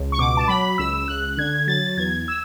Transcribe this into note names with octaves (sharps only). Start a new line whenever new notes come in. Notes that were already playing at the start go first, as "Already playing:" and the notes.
Already playing: C#2
C#6
B2 D6
A5
F#3 B5
C#2 E6
C#2 F#6
D3 G#6
F#3 A6
E2 G#6
E6